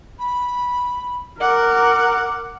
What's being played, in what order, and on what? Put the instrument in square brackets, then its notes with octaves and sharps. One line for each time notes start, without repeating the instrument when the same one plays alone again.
[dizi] B5
[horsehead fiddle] A#4 [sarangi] F#5 [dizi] D6